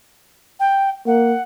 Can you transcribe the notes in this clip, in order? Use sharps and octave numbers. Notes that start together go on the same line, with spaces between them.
G5
A#3 F#5